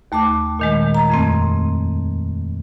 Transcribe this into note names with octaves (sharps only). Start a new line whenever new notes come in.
D#2 A3 A5 D6
A#2 D#3 G#3
A#5
F2 A3 C4